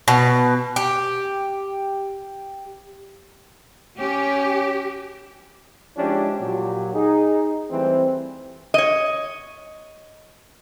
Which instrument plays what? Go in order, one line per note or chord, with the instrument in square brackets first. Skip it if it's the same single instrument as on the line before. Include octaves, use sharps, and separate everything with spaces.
[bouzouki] B2
G4
[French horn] C#4 [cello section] G4
[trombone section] F3 G#3 C#4 D4 E4 G4
A#2 F#3 G4
D#4 G#4
E3 G3 A3 C4
[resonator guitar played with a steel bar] C#5 D#5